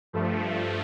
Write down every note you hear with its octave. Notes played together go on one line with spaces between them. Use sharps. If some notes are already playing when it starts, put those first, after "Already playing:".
G2 F3 A3